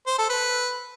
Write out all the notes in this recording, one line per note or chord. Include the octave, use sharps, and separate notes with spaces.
C5
A4
B4